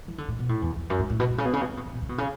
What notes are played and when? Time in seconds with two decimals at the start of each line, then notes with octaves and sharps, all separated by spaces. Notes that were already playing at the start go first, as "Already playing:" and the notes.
0.08 E3
0.18 D3
0.28 A2
0.39 B2
0.49 A2
0.62 E2
0.76 E2
0.90 F#2
0.99 G#2
1.10 A2
1.20 B2
1.30 B2
1.38 C#3
1.45 B2
1.53 C#3
1.61 B2
1.70 C#3
1.77 B2
1.85 C#3
1.93 B2
2.02 C#3
2.09 B2
2.18 C#3